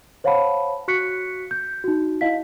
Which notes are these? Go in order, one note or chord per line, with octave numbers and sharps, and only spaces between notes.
C5 C#5 F5 F#5 A5 B5
F#4 C#6 F#6 B6 C#7
G6
D#4 F#4
E4 D#5 F5 B6